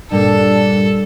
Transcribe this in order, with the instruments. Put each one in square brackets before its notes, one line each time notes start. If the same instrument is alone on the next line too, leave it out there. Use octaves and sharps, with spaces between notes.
[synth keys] G2 A#2 G3 [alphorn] D4 [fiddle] A4